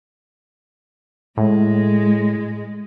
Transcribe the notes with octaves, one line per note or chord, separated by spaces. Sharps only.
A2 G#3